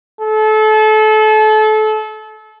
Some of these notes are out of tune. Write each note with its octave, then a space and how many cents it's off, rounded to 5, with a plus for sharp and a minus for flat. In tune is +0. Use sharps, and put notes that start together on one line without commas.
A4 -30